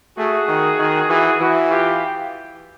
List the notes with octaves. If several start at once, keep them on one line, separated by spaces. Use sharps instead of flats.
A3 F#4 G#4
D#3
D#3
E3 F#4 G#4
E3 E4 F#4
F4 G4